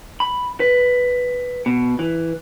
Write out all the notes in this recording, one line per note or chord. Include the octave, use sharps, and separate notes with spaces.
B5
B4
B2
E3